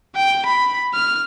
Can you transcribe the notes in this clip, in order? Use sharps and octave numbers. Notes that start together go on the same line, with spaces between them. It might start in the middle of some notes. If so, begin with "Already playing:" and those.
G5
B5
F6